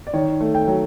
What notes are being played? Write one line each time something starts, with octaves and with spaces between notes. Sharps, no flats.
D5
D#3 C#5
A3
G5
F#3